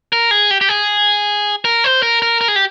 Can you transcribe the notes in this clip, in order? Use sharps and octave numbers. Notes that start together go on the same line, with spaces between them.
A#4
G#4
G4
G4
G#4
A#4
C5
A#4
A#4
A#4
G#4
G4